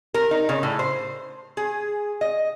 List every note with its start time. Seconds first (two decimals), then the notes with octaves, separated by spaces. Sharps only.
0.14 A#4
0.31 D#4
0.49 C#3
0.63 A2
0.79 C5
1.57 G#4
2.21 D#5